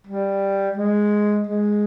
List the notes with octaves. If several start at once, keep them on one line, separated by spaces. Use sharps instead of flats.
G3
G#3
G#3